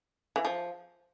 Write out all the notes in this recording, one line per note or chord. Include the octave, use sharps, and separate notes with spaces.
E3
F3